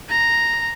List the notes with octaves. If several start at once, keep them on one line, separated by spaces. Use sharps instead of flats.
A#5